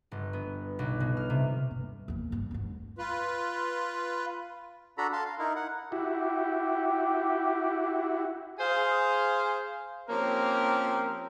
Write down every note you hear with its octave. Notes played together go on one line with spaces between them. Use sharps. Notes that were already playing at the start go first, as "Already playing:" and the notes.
G1
B3
B1
B2
F6
C3
G2
E2 A#2
G2 D3
D2 G2
F4 B4
D4 F#4 A4 A#5 B5
F5 A5 C6
F5
D#4 E4 A#4
F#5
E4 F#4 G4
G#4 C5 F5
F3 A#3 C4 C#4 G4 A#4